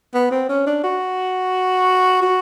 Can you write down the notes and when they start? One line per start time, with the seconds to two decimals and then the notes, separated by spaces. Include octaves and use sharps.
0.14 B3
0.32 C4
0.49 C#4
0.67 D4
0.84 F#4
2.22 F#4